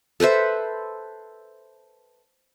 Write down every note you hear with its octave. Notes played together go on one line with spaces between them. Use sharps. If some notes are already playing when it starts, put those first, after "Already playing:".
A4 B4 C5 E5